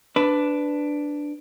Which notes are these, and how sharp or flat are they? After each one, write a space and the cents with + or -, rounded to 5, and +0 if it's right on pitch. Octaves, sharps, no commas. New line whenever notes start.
D4 +0 B4 +15